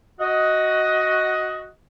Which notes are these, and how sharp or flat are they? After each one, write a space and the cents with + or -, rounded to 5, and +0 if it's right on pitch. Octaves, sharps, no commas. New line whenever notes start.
F#4 +0 D#5 +15